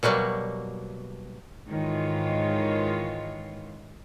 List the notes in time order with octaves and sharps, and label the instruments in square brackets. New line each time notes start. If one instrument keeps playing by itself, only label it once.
[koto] B2 F#3 G3 A#3
[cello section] G#2 D#3 E3 G#3 F4 C#5